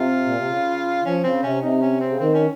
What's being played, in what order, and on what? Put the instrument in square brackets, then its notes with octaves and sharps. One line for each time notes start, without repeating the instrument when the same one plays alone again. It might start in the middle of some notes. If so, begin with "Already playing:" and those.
Already playing: [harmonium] C3 [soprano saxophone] F4
[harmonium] A#2
C3
C#3
[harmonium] F3 [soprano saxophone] C#4
[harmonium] C#3 [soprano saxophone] C4
[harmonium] C3 [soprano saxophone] C#4
[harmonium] C3 [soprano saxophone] D#4
[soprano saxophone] C#4
C4
[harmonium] C#3
[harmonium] D#3 [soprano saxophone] C4
[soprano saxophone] C#4